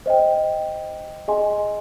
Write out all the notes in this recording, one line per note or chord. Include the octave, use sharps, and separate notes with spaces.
C5 D#5 G5
G#4 D#5 G#5 C6